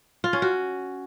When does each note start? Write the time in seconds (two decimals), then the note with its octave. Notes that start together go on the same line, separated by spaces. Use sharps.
0.24 F4
0.33 C#4
0.42 F#4